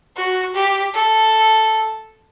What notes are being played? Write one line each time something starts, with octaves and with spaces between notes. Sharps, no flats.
F#4
G4
A4